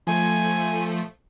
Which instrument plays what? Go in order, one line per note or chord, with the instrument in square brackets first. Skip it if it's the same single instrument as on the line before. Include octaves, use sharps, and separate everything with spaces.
[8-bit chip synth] F3 A3 [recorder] G#5